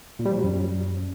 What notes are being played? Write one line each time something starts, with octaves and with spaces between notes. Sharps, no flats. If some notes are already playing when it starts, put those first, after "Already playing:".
A#2
G3
F3
F#3
F#2